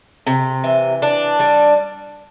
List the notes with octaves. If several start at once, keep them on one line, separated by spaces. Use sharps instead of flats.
C3
E3
D4
G3